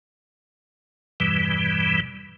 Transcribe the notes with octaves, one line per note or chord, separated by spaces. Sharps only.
E2 G2 B2 E3 G3